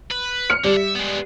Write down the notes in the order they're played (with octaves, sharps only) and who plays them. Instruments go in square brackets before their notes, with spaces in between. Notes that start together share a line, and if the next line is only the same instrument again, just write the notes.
[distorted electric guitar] B4
[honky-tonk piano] F6 C#7
[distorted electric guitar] D3 [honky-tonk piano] G3
[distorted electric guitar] E5
G#3 B3